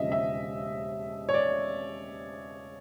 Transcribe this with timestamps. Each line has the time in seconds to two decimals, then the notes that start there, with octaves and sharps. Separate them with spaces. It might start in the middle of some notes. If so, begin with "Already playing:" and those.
Already playing: E1 D#2 C#3 F3 D#5 E5
0.12 E5
1.29 C#5
1.34 D5